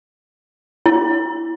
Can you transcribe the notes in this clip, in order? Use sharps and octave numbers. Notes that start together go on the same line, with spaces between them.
E4